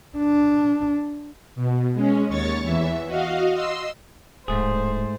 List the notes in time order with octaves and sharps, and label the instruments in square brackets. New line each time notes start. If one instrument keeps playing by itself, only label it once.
[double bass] D4
[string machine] B2
G#3 C#4
D#2 C#5 C#6 A6 C#7
E2 E3 E5
F#4 D#5 F5
D#5 C6 E6
[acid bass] D1 [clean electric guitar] G#2 A3 G#4 [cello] C5